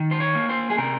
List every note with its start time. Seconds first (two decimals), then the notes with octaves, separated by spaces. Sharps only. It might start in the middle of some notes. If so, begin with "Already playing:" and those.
Already playing: D#3
0.11 C5
0.20 C#5
0.35 A#3
0.49 C5
0.70 G#4
0.77 C3 A#4